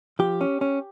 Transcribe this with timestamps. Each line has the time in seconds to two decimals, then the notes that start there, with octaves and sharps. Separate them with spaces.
0.19 F3 G4
0.41 C#4
0.61 C#4